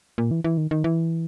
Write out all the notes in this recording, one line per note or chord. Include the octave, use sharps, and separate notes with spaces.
A#2
E3
E3
D#3
D#3
E3